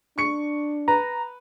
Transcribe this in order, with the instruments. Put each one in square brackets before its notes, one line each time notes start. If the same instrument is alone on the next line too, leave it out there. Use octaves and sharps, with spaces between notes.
[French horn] D4 [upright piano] C#6 C#7
[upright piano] B4 [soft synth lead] A#5